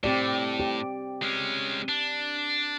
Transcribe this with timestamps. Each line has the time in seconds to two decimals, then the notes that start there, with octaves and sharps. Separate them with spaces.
0.04 A2 C4 G4 D5
0.60 G4
1.22 G#3 C#4
1.89 D4